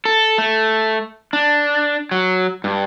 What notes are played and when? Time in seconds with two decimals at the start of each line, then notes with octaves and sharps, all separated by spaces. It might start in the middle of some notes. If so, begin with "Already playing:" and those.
0.05 A4
0.38 A3
1.33 D4
2.11 F#3
2.64 G2